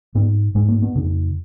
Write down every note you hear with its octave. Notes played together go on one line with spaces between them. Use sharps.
G#2 B3
G#2 G#3
A#3
B3
F2 C#3